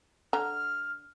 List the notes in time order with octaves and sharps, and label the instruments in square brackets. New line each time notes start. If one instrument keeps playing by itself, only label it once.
[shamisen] D3 A#5 [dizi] F6